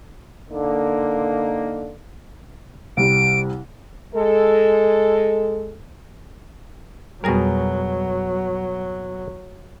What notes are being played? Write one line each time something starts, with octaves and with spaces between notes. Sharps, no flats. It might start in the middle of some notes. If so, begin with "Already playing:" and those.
D3 A#3 D#4
C2 G3 D7
G#3 A4
F2 B2 F#3 G3 G#4 A#4 A#6